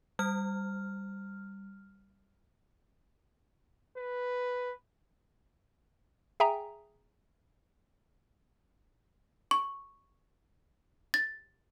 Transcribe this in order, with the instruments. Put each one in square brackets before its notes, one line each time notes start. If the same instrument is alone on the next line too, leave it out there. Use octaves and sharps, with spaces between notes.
[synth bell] G3 F6
[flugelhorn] B4
[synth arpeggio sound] G#4 E5 G5 G#5 A#5
[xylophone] C#6
A6